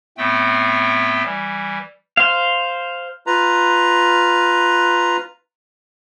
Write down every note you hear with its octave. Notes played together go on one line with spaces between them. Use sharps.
A2 A3 B3 C4 G5
E3 G3
C5 F5
F4 B4 A#5